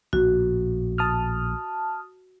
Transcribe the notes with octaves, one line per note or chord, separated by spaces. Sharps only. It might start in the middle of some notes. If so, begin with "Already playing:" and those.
A#1 A2 F#4
A5 D#6 F6